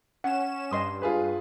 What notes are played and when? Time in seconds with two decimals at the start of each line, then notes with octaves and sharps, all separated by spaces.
0.24 C#4 F#5 E7
0.71 G2 D#5 C6 D#6
1.02 F4 G#4 B4